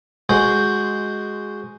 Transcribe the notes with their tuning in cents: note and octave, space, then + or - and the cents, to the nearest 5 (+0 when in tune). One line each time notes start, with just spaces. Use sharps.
G#3 +0 F#4 +0 C5 +0